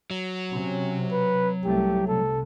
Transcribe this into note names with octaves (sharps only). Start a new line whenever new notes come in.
F#3
C3 C#4
B4
C2 A3 G4
C3 A4